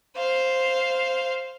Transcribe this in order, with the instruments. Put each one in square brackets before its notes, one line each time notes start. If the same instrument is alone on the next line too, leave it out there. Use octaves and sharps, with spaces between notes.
[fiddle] C5 F5